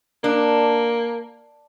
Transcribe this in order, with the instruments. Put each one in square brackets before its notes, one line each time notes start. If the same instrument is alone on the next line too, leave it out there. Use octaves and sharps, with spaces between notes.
[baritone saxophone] A#3 [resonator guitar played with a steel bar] D4